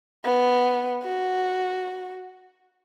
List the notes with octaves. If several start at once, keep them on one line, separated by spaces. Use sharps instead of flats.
B3
F#4